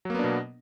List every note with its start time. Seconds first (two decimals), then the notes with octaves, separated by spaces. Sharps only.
0.05 F#3
0.10 A#3
0.14 B3
0.19 D4
0.24 B2